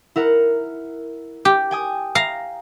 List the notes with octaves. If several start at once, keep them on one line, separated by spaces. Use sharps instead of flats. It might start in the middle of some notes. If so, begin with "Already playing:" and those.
E4 A#4 F#5
G4
G5 G#5 D#6
F5 A#5